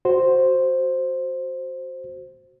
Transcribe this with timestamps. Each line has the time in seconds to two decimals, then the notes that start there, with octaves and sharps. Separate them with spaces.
0.05 F#4 C5